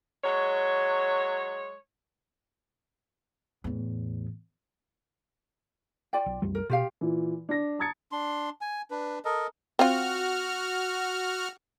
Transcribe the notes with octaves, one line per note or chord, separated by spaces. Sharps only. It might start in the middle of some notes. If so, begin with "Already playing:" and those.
F#3 G#3 C#5
E2 A2
F4 D5 G5
B1
C2 F#2 G3
A#4
B2 F4 G4 F5
A#2 E3
D4 A#6
A5 A#5 D#6 G#6 A6 C#7
D4 C6
G#5
D4 B4
A4 A#4 D#5
C4 F4 F#4 F6